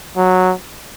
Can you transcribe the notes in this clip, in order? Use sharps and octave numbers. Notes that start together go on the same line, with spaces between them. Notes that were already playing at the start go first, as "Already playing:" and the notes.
F#3